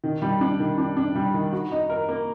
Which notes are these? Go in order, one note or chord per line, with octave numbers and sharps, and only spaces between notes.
D#3
G3
D4
D#3
D4
D4
G3
D#3
F#4
D#4
A#4
A#3